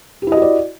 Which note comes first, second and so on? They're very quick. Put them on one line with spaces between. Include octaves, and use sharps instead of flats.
G4 E4 D#5 F#4 D5